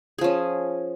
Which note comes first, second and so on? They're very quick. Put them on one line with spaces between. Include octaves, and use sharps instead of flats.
G#4 F3 C#4